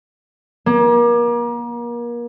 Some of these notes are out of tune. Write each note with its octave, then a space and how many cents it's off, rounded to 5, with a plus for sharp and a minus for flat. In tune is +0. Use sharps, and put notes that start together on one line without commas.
A#3 +35